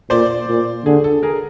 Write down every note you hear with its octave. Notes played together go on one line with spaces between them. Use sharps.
A#2 C5 D5
A#2
D3 G#4
A4
G#4 A#4